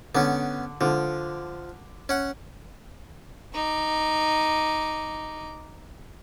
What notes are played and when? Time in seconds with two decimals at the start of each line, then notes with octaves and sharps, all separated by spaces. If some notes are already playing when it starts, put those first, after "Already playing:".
0.15 D3 B3 C#4
0.81 D3 F3
2.09 C#4 F#5
3.54 D#4 D6